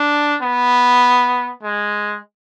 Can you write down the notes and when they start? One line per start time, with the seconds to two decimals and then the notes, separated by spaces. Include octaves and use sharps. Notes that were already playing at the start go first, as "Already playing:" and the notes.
Already playing: D4
0.42 B3
1.63 G#3